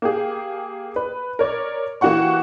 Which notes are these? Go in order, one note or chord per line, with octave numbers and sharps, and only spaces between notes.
A#3 G4 G#4
B4
A#4 C#5 D5
E3 A#3 F#4 G4 F#5 C#6